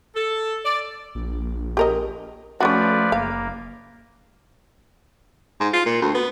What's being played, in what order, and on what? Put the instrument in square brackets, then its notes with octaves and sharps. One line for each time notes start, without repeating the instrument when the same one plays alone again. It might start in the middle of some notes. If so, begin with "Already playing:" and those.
[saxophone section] A4
D5
[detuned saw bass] A#1
[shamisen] G4 A#4 D#5
[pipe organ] F3 B4 D5 [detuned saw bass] A3 [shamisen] C#4 D4 F#4
[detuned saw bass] F#1 [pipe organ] A#3 [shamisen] F5
[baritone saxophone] G#2
F4
A#2
D2
B3